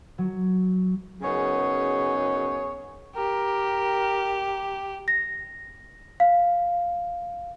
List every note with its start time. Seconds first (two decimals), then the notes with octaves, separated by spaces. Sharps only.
0.18 F#3
1.22 F#2 C#3 B3 D#4 G#4 C#5
3.16 G4 A#4
5.08 A#6
6.20 F5